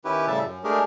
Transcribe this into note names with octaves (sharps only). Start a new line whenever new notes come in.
D#3 C#4 E4 G4 B4
A2 C#3 G3 E5 A5
F#2
G#3 A3 D4 G4 G#4 A#4